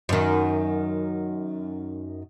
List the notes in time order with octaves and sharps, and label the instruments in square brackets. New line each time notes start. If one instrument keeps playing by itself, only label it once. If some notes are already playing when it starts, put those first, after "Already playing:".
[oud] F#2 D#3